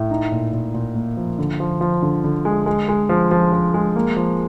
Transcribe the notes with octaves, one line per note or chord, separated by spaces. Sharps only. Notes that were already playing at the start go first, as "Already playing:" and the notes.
Already playing: A2
D#4
A#2
A#2
A#2
A#3
F3
D3
F3
F3
D3
D3
G#3
G#3
G#3
F3
F3
F3
G#3
A#3
F3